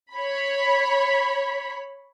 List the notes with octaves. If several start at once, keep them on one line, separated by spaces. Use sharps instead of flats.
C#5 B5